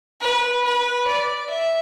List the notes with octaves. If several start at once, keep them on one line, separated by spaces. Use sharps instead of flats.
B4
B4
D5
E5